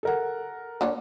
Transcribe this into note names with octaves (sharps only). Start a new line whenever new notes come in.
A4 A#4 F#5
D3 A#3 C#5